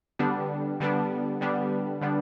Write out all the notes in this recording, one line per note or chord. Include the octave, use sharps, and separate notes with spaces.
D3 G3 B3 D4
D3 G3 B3 D4
D3 G3 B3 D4
D3 G3 B3 D4